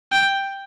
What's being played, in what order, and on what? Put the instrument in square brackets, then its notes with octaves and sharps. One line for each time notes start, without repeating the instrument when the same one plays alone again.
[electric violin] G5